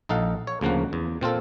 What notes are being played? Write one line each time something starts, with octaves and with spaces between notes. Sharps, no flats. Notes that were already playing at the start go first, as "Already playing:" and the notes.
A#1 D#4 A4 F5 F#5
C#5
D2 C#3 F3 A#3 F#5
E2
A#2 C4 F4 A4